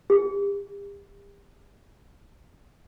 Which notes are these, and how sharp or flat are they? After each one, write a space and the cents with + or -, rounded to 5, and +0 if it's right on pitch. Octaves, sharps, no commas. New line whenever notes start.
G4 +35